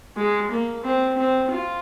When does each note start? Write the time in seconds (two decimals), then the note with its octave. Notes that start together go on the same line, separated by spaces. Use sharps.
0.17 G#3
0.51 A#3
0.84 C4
1.17 C4
1.51 F4